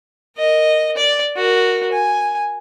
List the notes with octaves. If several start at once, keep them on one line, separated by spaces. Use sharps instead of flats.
A#4 D#5
D5
F#4 A#4
G#5